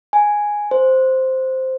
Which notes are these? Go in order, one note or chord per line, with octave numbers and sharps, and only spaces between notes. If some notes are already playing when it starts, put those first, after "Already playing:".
G#5
C5